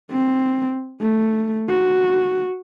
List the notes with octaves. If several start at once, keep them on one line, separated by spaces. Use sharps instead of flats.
C4
A3
F#4